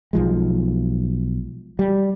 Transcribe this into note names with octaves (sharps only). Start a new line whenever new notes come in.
B1 F3 G#3
G3